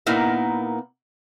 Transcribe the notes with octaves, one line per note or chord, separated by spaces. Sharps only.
A#2 A#3 B3 D#4 E4 A#4